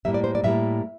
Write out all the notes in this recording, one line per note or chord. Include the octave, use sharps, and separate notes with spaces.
A2 G3 A#3 E5
D5
C5
D5
A2 G3 A#3 E5